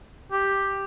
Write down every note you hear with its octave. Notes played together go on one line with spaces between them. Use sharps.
G4